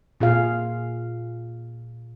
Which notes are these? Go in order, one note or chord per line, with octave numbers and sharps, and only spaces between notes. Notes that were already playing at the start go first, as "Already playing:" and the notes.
A#2 F4 G#4 F5